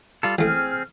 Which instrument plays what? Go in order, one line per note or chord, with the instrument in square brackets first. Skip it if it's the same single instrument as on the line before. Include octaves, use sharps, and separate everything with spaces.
[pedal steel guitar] G3 F4 A4
[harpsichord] A1 A3 [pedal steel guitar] C4 G#4 [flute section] F6